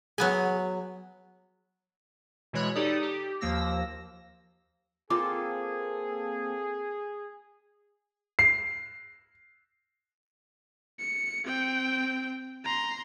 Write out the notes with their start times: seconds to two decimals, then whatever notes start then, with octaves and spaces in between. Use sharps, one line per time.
0.18 F#3 B3 G#4 F#5 G#5
2.53 B2 E3 G#3 C#5 B5 F#6
2.75 D#4 G4 A4 D5 D#6
3.03 G4
3.41 D#2 F3 A#3 E6 A#6
5.10 A#3 C4 F4 G#4 A4 D6
8.39 C7
11.00 C#7
11.45 C4 G5
12.65 A#5 C6